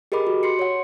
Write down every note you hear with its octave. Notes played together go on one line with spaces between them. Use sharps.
G4 G#4 A#4 D#5 B5 D6
F#4
C6 C7 C#7
C#5 F#5